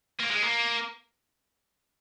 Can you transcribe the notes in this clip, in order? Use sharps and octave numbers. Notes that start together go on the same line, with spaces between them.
A#3
G#3
A#3